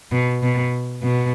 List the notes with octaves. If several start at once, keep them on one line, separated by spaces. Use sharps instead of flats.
B2
B2
B2